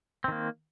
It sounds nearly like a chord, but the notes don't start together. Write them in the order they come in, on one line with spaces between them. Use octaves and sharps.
C4 D#3 A#3